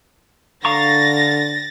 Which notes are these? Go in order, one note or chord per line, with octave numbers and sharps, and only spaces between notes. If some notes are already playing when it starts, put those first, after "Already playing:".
D3 F5 A#5 C#6 A6 A#6